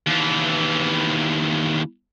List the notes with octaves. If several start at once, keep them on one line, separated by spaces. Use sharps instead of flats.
D#2 E3